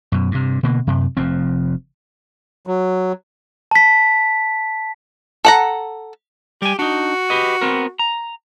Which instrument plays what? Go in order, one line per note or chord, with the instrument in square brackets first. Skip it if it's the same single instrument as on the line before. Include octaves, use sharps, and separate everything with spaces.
[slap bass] F#2 B2
G2 C3
B2 D3 A#3
F#2 C3
F1 F2 F3 C4
[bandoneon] F#3
[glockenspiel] A5 B6
[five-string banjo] A4 F#5 A#5
[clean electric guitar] G3 G#5 [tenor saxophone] G4
[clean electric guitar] D4 D#4 [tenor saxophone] F#4
[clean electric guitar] G4 B4 D#5
B3 C4 A#4
A#5